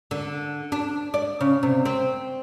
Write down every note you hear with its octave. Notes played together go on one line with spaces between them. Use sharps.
D3
D4
D5
C#3
C3
C4